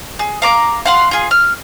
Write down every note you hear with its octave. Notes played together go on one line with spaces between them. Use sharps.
G#4
F5 A#5 D6
F5 F#5 C6
F4 G#4
F6